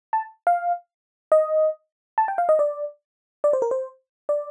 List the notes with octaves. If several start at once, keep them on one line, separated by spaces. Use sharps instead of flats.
A5
F5
D#5
A5
G5
F5
D#5
D5
D5
C5
A#4
C5
D5